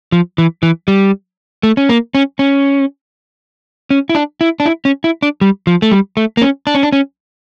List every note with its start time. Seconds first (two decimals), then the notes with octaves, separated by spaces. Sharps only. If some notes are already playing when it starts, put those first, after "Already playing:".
0.12 F3
0.38 E3
0.63 E3
0.88 G3
1.63 A3
1.77 C#4
1.89 A#3
2.15 C#4
2.39 C#4
3.91 C#4
4.09 E4
4.15 D4
4.41 E4
4.60 D4
4.66 E4
4.85 C#4
5.04 E4
5.22 D4
5.41 G3
5.67 F3
5.82 A3
5.91 G3
6.17 A3
6.37 A#3
6.41 C#4
6.67 D4
6.75 C#4
6.83 D4
6.93 C#4